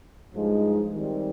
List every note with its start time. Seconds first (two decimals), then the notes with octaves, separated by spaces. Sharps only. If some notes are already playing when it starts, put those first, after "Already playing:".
0.33 G2 F3 G#3 D#4
0.93 D#3 G3 C4